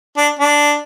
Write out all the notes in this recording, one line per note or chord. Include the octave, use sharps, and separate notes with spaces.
D4
D4